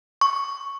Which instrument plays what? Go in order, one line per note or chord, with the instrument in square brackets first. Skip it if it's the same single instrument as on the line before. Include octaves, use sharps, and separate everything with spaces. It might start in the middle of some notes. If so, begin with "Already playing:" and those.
[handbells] C#6